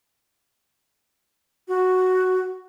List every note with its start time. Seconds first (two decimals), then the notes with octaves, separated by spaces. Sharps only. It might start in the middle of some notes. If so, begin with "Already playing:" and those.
1.68 F#4